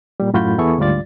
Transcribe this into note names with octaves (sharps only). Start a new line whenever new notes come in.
A#2 G3
F#2 A2 F4 F#4 B5 G6
E2 B3 E4 G#4 A4 C#6
D2 G#2 G3 F4 D5 A6